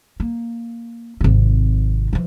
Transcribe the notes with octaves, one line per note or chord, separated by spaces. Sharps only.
A#3
G#1 C3
E3 F3